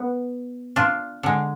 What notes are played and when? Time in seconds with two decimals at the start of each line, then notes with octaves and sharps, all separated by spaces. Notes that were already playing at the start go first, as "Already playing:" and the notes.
Already playing: B3
0.76 D4 F4
1.23 D3 G#3